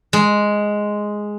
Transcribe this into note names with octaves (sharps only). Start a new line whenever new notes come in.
G#3